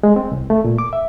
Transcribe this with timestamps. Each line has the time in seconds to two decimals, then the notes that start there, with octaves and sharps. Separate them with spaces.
0.03 G#3
0.16 C4
0.32 C2
0.50 A3
0.64 A#2
0.78 D6
0.93 E5